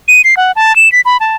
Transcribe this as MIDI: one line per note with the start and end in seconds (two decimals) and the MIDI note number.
0.08 0.21 99
0.24 0.35 96
0.37 0.52 78
0.56 0.75 81
0.76 0.91 100
0.92 1.01 95
1.05 1.17 83
1.20 1.36 81